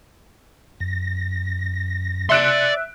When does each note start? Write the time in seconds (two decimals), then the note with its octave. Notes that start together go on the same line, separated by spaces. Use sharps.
0.80 F#2 A#6
2.30 D5 E5 C6 F#6 D7